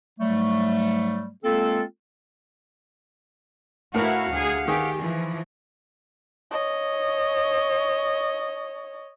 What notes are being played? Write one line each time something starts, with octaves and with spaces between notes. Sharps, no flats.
G#2 F#3 G3 A3
G#3 A#3 C4 F4 A4
A2 E4 F#4 A#4 F5 F#5
D2 G#4
D#3 G4 G#4
E3 F3
C#5 D#5